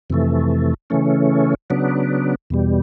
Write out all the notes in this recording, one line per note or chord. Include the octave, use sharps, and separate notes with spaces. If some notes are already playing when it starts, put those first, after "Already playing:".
F2 C3 E3 A3
C#3 E3 A3 C#4
C#3 F#3 B3 D4
E2 B2 G3